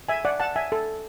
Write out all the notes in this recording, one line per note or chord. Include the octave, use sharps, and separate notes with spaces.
E5 G#5
D5 F#5
F#5 A5
E5 G#5
A4